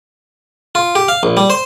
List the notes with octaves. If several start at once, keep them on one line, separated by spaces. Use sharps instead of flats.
F4
G4
F5
A#1
G3
C5